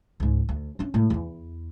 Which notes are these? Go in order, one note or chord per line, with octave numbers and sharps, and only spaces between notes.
C#2 G#2
D2
C#4 D4
A2 G#3
E2 E4